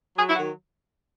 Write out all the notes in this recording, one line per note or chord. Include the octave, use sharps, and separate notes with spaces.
F#3 G#4
E4
D#3 F#4